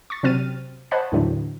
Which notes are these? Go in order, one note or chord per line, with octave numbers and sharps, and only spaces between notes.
C#6 A6
C3 F#3 C4 F6 A6 D#7
C5 C#5 D#5 F#5 A5 B5
D#2 A2 D3 E3 F#3